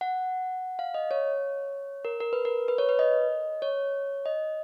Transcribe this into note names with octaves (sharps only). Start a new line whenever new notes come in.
F#5
F5
D#5
C#5
A#4
A#4
B4
A#4
B4
C#5
B4
D#5
C#5
D#5